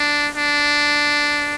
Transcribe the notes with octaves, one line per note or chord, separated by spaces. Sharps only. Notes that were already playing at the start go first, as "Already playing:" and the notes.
Already playing: D4
D4